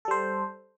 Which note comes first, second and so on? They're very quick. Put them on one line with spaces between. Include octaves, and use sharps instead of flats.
A4 G3 C5